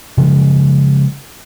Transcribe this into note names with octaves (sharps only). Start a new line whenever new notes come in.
C#3 F3 F#3 G#3